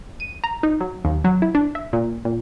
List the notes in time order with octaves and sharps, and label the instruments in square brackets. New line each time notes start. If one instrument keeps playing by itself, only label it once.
[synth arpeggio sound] D#7
A#5
D#4
F#3
D#2
F#3
E4
D4
E5
A#2
A#2